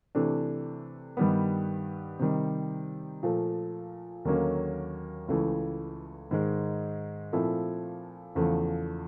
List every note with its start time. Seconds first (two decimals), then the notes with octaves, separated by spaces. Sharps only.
0.15 C3 E3 A3 D4
1.17 G2 D#3 G3 B3
2.19 C3 D#3 G3
3.23 A#2 F3 A3
4.25 D#2 D3 F#3 A#3 C#4
5.28 C#2 C#3 E3 A3
6.31 G#2 D#3 G#3
7.33 A#2 F3 A3 C4 E4
8.35 E2 C#3 F3 A3